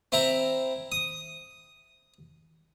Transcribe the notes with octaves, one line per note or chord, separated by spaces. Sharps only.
C4 E4 A#5
D#6